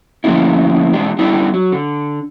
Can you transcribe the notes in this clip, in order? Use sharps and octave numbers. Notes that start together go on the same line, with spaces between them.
D3 F3 A3 A#3 C#4 E4
E2 B2 G#3 D4 G4
D3 G3 B3 D4 E4
F#3
D3